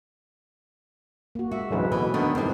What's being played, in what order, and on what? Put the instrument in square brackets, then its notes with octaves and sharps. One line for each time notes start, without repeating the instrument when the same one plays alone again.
[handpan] A#3 F#4
[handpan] G#3 E5 [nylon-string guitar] F#4
[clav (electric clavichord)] A1 D2 G#2 [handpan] F#3 B4
[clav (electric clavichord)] B2 [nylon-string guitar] E3
[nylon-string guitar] D3 D4 [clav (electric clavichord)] D#3 B3
[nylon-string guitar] G2 G3 [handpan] C4 D#4 E4